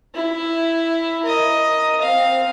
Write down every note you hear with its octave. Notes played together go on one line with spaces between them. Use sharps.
E4
A#4 D#5
C4 F5